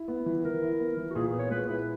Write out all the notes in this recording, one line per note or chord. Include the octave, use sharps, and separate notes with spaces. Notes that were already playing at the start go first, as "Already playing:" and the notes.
Already playing: E4
B3
E3
E3 A#4
E4
B3
E3
F#4
A#2 G#4
G#4
B3
C#5
G#3 B4
E4 B4